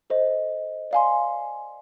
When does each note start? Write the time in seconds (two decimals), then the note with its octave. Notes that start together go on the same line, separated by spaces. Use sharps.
0.10 A4 C5 D#5
0.91 D5 F5 G#5 C6